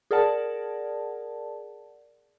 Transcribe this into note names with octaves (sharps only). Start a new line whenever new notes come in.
G#4 A#4 D5 F#5 A5